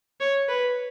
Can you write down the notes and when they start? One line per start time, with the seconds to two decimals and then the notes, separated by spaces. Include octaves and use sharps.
0.20 C#5
0.49 B4